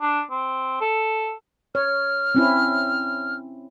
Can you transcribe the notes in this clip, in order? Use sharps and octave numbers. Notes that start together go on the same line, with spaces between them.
D4
C4
A4
C#5 F6
C4 C#4 E4